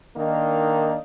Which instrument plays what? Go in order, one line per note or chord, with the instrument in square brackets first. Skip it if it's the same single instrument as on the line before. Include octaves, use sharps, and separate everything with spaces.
[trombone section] D#3 A#3 D4 D#4